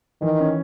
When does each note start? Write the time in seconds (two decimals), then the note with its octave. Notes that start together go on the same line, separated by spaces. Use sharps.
0.22 D#3 E3
0.39 C#4